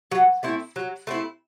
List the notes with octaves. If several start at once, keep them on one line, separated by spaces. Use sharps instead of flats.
F#3
A3 C4 E4
F#3
A3 C4 E4